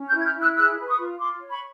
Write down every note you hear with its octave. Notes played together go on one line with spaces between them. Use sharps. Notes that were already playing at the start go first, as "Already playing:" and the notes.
Already playing: C#4
F6 G6
E4
G#6
F6 G6
E4
E6 F#6
G#4 E6 F#6
B4
C#6 D#6
F4
F4 C6 D6
C#5
B5 C#6